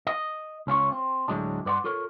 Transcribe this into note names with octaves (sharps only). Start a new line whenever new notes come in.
D#5
C#2 C#4 F4 C#5
C4
D2 A2 F#3 G#3 D4
G2 B4 D5 F#5 C6
F4 A4 A#4 C#5